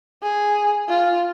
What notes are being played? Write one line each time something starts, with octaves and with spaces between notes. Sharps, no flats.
G#4
F4